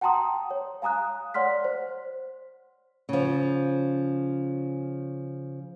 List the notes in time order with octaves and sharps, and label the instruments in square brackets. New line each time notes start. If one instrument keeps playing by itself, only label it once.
[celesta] F#5 G5 A5 A#5 C6 D#6
C#5
F5 G#5 A#5 D#6 F#6
C#5 D5 F#5 C6 F6 B6
C5
[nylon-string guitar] C#3 F3